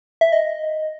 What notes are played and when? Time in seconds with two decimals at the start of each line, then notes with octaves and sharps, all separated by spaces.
0.21 E5
0.32 D#5